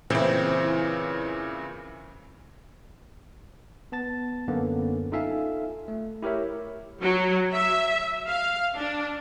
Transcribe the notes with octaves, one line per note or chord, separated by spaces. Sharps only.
A#2 C#3 E3 C4 E4
B3 A5 A6
F#2 D3 A#3 B3 C#4
D#4 F4 A4 E5 F5 G#5
A3
E4 G4 A#4 C#5 E5
F#3
E5
F5
D4